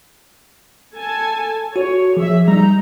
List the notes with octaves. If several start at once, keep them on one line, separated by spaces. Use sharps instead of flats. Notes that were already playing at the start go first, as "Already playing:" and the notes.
A4 G#5 A5
F#4 C#5
F3 G#4 E5
G3 D#4 A#5